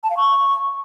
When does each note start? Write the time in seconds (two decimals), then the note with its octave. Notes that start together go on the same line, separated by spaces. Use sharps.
0.04 A5
0.10 F5
0.17 C#6